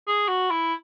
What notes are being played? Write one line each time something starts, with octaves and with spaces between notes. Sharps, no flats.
G#4
F#4
E4